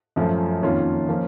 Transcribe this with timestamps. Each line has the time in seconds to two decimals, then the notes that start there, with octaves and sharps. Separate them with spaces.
0.16 F#2 F3 A3
0.62 F2 D#3 A#3 C#4 F4
1.09 F3 A#3 C#4